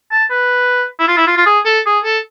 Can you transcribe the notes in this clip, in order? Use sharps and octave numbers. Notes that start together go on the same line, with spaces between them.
A5
B4
E4
F4
E4
F4
F4
G#4
A4
G#4
A4